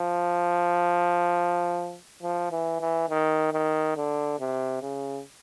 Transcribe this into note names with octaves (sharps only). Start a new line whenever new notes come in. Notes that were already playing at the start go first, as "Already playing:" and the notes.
Already playing: F3
F3
E3
E3
D#3
D#3
D3
C3
C#3